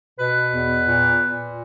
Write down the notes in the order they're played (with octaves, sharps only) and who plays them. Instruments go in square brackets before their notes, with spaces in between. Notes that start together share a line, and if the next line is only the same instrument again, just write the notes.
[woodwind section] B2 B4
E2
A#2
A#2